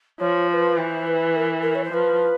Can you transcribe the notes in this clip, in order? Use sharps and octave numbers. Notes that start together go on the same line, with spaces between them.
F3 C#5
C5
B4
E3 C5
B4
A#4
A#4
C#5
C5
F3 B4